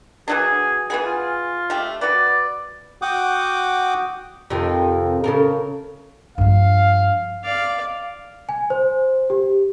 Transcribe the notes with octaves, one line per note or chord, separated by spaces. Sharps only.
E3 F#3 D4 G#4
E3 B3 G#4
F4
A3 G4
F#4 B4 D5
F#4 F#5 G5 D6 D#6
F2 C3 D#3
C#3 A4 A#4
G2 F3 F5
D5 F5
G#5
C5
G4